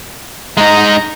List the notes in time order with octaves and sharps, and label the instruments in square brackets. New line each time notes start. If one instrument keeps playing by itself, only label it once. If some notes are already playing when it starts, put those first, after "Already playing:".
[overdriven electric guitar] G#3 D#4 [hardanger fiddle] A#5